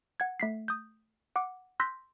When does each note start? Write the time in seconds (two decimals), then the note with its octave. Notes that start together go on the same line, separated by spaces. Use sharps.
0.20 F#5 G#6
0.40 A3 B6 C7
0.68 D#6 G6
1.36 F#5 D6
1.80 C6 E6 F#6 G6 A#6 B6